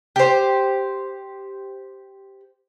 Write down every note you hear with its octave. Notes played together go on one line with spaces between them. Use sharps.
G4 C5